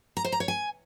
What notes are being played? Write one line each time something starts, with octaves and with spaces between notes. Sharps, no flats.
A#5
C5
A#5
C#5
G#5